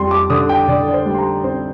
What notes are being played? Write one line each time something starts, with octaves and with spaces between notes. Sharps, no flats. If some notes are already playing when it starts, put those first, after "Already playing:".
Already playing: F2 G3 C6
D6
D3 D#6
G5
D3 D5
D5
C5
G3
C6
A#5
C4 C5